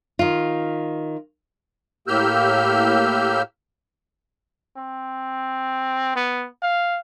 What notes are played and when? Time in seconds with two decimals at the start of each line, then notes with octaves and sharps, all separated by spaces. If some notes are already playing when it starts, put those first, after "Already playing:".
0.19 D#3 F4
2.08 A2 A#3 G4 E6 F6 G6
4.77 C4
6.16 B3
6.63 F5